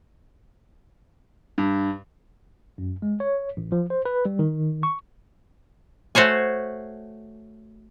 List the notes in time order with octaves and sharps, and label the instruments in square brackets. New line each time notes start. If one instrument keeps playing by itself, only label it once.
[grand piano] G2
[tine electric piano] F#2
G#3
C#5
A1
F3
C5
B4
G3
D#3
C#6
[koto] A3 F#4 C5 C#5 G#5